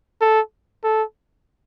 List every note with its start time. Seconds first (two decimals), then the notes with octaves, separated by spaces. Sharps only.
0.21 A4
0.84 A4